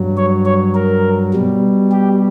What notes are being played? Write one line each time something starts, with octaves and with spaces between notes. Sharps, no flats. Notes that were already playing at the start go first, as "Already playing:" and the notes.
Already playing: G2 F#3
C#5
C#5
A#4
B2 G3
G4